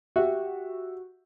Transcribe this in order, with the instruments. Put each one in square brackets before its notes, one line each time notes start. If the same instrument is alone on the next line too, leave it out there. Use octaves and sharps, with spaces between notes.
[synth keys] F#4 [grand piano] G4 E5